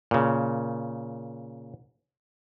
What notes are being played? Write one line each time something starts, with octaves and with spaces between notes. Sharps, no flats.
A#2 C#3